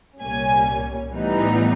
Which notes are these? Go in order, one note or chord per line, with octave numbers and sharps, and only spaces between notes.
C2 A#2 G3 A#3 C#4 G#5
A2 E3 G3 B3 D#4